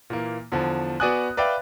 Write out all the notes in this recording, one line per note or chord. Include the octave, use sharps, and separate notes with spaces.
A#2 E3 A#3
E2 D3 F3
B3 F#4 D5 G#5 D#6 F#6
B4 D5 E5 F5 G5